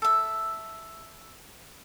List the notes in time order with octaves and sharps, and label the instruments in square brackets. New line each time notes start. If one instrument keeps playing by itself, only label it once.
[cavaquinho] A4 E5